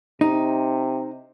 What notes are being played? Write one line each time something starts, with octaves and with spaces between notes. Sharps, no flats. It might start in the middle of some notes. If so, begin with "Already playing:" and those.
C3 D#4